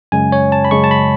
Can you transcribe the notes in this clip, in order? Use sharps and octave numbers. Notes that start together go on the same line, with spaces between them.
F#2 C#3 G#3 G#5
C#5
A5
B5
F#2 C#3 G#3 C#6
A5
B5